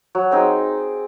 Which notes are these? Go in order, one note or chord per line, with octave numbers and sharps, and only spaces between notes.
F#3
C4 D#4 G#4